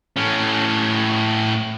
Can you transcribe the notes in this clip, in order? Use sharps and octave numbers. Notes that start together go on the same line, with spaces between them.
A2 C#4